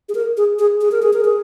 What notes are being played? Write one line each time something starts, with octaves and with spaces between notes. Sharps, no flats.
G#4
A#4
G#4
G#4
G#4
A#4
G#4
A#4
G#4